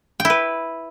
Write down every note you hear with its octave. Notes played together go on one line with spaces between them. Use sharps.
G5
E4
B4